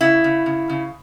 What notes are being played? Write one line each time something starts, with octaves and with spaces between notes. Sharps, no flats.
C#3 E4
C#3
C#3
C#3